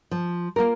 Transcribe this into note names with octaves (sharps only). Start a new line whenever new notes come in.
F3
A#3 F4 A#4